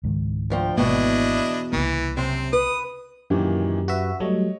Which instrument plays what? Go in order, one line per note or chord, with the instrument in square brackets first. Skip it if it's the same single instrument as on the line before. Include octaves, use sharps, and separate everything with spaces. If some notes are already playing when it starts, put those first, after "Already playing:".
[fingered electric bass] C#2 G#2 D#3
[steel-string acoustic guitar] D2 F3 G5
[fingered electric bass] G#1 G#3 A#3 [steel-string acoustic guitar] E2 B2 [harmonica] D4 E4 D#5
[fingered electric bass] C2 C#3 A#3 [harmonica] E3
[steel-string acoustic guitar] F#2 C3 [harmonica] C4
[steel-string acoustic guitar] B4 [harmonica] D#6
[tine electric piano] F#2 G4 [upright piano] A#2 D#3 E3
[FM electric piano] F#4 E5 [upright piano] B4
[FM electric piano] F#3 G3 A3 [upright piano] C#5 D#5